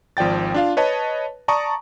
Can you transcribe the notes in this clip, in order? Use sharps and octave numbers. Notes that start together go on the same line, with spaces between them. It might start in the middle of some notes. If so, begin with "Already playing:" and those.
G#1 F3 D5 G5 A6
D4 F4 F5
B4 C#5 D#5 A5
D5 A5 A#5 C#6 D#6